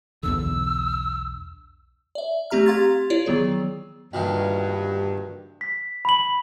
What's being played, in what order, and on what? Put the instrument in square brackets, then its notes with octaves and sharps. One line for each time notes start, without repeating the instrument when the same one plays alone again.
[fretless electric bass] B1 E2 D3 [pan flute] E6
[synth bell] D5 E5
A3 C4 G4 A#5 F6
G4 F5 C6 G#6 A6
E4 F4 C#5 D5
D#3 F#3 B3 G#4
[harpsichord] D2 A#2 D#3 [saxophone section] G2
[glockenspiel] B6
B5 F#7